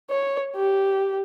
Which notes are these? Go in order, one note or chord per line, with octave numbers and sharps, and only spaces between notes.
C#5
G4